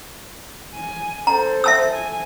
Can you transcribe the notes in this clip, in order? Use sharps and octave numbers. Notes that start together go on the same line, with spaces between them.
G#5
A4 C5 A#5
E5 A5 E6
G#5